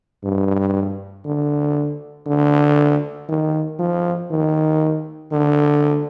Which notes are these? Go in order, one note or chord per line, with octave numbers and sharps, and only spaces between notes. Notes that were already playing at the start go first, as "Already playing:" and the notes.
G2
D3
D3
D#3
F3
D#3
D3